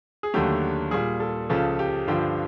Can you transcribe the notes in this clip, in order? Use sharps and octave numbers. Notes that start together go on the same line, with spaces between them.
G#4
D#2 D3 F#3 A3 G4
A#2 G3 G#4
A4
C#2 C#3 F3 A4
G4
G2 D3 F3 G4